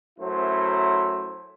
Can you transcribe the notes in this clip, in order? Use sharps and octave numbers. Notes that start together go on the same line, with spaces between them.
F#2 F#3 A3 E4 C5